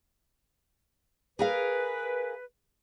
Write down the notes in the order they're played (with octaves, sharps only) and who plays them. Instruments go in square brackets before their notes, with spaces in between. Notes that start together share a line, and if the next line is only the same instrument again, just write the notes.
[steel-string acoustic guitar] G#4 A#4 F5 [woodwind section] B4